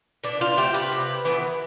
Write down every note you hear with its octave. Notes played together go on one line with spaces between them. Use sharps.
B2 D4
F4
A3 C4 G4
B4
C3
E3 B3